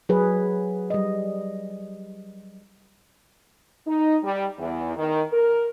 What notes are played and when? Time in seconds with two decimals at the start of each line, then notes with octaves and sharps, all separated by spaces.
0.09 F#3 G#4 B4
0.90 G3 D#5
3.87 D#4
4.23 G3
4.59 E2
4.96 D#3
5.32 A#4